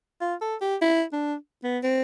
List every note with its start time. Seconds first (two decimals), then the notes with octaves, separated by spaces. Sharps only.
0.21 F4
0.41 A4
0.61 G4
0.82 E4
1.13 D4
1.64 B3
1.84 C4